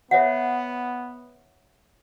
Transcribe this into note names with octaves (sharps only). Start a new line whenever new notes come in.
B3 C#5 E5 F#5